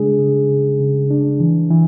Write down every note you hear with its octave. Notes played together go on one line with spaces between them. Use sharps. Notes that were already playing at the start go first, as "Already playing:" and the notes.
Already playing: C#3 G#3 D4 G#4
C#3
C#3
C#3
D4
E3
E3